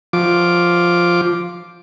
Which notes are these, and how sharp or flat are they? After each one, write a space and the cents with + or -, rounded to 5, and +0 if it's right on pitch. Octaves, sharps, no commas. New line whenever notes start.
F3 +0 D6 +0